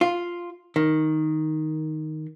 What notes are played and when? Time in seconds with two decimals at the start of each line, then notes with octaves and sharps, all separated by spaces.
0.01 F4
0.76 D#3